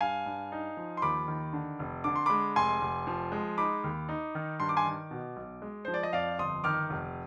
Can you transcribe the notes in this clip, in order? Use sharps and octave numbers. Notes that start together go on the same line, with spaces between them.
G2 F5 G#5
G2
D#4
F3
C6
D#2 B5 D6
D#3
D3
F1
D3 D6
C6
G#3 B5 D6
F1 G#5 C6
F1
F3
G#3
D#4 B5 D6
D#2
D#4
D#3
G2 C6
D6
G#5 C6
D#3
B2
B1
G#3
F3 C5
D5
D#5
F2 D5 F5
G1 C6 D#6
D#3 D6 F6
F1